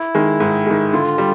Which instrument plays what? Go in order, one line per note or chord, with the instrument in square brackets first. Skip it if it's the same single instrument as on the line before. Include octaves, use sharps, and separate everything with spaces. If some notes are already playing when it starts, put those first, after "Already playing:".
Already playing: [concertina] E4
[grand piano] D#3 G#3
G#2
D#3 G#3
[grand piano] D3 [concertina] F4
[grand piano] G3